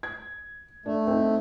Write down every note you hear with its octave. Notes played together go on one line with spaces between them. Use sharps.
G#6
A3 D4
C4 D#4